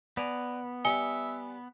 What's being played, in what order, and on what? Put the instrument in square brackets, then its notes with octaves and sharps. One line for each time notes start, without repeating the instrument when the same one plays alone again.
[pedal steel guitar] B3 [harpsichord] D5 G#5 A#5
[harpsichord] G3 [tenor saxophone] E5 [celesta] G#5 C#7 G7